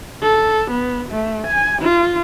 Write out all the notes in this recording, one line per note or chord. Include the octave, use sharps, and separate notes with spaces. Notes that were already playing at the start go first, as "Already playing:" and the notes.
A4
B3
A3
G#5
F4